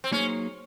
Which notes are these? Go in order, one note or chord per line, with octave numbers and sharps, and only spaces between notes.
C4
F#3 A#3 C#4 D#4 G#4